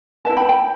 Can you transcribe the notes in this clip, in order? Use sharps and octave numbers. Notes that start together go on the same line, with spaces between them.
E4 B4 E5 A5
G5 B5
G5 B5